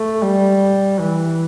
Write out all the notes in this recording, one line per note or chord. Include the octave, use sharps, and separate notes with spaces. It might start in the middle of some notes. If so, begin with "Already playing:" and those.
Already playing: A3
G3
E3